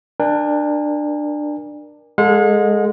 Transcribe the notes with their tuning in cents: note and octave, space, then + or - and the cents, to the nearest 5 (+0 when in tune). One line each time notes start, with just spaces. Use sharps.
D4 +20 A#4 +20 G#5 -40
G#3 -5 A4 +20 F#5 -45